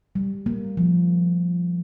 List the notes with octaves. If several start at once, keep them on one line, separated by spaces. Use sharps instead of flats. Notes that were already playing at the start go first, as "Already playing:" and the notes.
G3
A#3
F3